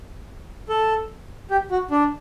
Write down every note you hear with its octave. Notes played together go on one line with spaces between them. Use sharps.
A4
G4
F#4
D4